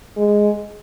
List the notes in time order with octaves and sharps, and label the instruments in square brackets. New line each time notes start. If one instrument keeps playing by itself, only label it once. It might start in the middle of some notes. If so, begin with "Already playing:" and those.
[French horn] G#3